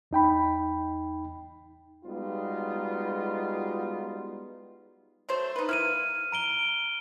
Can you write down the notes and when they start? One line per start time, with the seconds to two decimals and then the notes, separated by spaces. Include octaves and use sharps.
0.11 E2 D#4 G5 B5
2.05 G3 G#3 B3 D#4 F4 F#4
5.29 F#3 A3 C5
5.56 D#4 B4
5.69 A#3 E4 F6 D#7
6.32 A#5 D7 G7